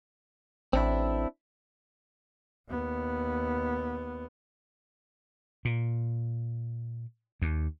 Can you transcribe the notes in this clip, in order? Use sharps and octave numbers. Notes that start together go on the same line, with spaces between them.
A1 C4 D4 E4
D#2 B3
A#2
D#2